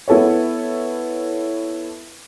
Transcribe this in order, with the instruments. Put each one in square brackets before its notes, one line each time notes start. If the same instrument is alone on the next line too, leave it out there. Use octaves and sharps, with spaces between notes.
[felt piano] B3 E4 A4 B4 C#5